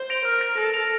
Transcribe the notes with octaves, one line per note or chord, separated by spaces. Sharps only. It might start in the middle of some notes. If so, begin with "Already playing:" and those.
Already playing: C5
A#6 D7 F7
A#4 F6
A#6 F7
A4 F6
A#6 F7